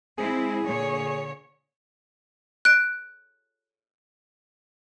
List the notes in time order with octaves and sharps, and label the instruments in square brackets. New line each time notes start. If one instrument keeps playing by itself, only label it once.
[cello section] G#3 C4 E4 [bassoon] G#4
[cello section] A#2 D3 C#5
[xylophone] F#6 D7